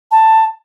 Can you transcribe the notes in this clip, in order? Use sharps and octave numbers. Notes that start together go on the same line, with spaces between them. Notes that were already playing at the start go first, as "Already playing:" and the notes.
A5